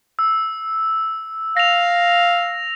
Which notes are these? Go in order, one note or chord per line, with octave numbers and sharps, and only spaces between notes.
E6
F5 A#6 F7